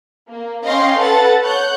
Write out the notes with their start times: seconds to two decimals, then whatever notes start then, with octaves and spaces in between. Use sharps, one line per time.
0.27 A#3
0.63 C#4 D#5 F5 G5 C6
0.97 A4 B4 F#5 A6
1.42 C#5 F#5 F#6 G6